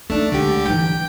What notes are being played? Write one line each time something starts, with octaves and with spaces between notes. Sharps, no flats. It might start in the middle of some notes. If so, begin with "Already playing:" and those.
A3 D4 D#4
C#2 D3 G#3 G4
E3 D#4 G5